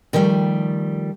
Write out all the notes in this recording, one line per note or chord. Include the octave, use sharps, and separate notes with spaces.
D3 D#3 F3 G3 A3